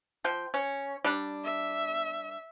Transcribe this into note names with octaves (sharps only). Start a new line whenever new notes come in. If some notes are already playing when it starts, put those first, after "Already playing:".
F3 G5
C#4
G3 D4
E5